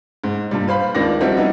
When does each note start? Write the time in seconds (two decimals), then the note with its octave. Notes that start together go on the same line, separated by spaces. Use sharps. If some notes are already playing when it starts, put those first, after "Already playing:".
0.24 G#2
0.51 G2 A#2 G3
0.68 B4 C5 F5 B5
0.95 C#2 D#3 D4 D5 A#6
1.20 F3 G3 C4 D#4 E4 F#4
1.37 G3 B3 C#4 D#4 E4